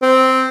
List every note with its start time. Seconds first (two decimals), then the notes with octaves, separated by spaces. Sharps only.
0.02 C4